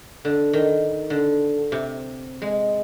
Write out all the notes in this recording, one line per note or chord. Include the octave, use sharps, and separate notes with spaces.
D3
D#3
D3
C3
G#3